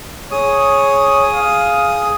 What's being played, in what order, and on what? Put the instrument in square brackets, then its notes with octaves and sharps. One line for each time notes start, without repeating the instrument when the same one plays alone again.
[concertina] G#4 D#6 [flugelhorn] C#5
[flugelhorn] F5